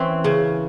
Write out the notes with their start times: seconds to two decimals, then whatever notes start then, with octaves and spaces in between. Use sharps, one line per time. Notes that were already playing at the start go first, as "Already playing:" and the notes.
Already playing: E3 C4 C#4
0.24 C#3